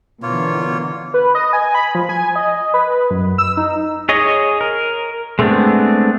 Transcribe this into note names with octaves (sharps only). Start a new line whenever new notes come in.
B2 D3 E3 A#3 F4 C#5
B4
D#5
G#5
B5
F3
G#5
D#5
B4
F#2
E6
D#4
G#4 C#5 D#5
A#4
G#3 A3 B3 C4 D4